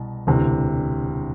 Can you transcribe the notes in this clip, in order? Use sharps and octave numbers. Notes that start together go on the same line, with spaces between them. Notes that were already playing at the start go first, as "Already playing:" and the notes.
Already playing: C2 B2
E1 D2 C3 E3